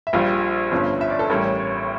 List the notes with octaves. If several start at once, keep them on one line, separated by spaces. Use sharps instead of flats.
E5
A#1 A#2 G3 F5
G1 G2 F3 C#4
E5
D5
A4
A1 A2 G3 C#4 A#4